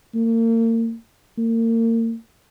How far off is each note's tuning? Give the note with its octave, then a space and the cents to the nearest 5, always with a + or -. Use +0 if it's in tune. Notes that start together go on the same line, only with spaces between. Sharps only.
A#3 -35
A#3 -35